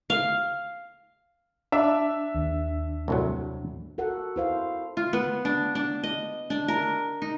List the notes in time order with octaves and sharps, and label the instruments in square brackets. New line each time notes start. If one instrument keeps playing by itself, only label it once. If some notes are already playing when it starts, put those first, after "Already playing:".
[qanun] F5
[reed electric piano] D4 [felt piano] E5
[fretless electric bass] D#2
[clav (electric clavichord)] C2 A2 F#3
[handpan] F#4 A4 A#4 F#5
E4 C5 F5
[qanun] F4
B3
D4
D4
D#5
D4
A#4
D#4